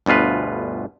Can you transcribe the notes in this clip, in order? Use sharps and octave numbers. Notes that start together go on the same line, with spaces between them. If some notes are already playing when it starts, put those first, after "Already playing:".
G1 D2 B2 F4 B4